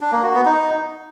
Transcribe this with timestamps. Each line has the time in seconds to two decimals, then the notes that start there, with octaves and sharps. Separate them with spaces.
0.01 D4
0.12 A#3
0.23 F#4
0.34 B3
0.45 D#4